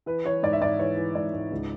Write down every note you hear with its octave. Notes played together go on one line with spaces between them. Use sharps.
E3 B4
E3 C#5
G#2 D5
E5
G#2 D5
E3 C#5
E3
G#2 D5
G#2
C#2